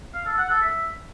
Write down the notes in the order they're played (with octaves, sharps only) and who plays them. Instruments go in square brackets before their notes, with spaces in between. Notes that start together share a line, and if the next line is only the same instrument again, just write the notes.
[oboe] F5
A4
F#5
A4
E5